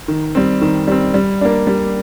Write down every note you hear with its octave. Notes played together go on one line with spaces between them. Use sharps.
D#3
G3 C4
D#3
G3 C4
G3
A#3 D4
G3